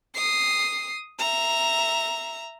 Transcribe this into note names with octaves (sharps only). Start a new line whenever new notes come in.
D#6 C7
E5 A#5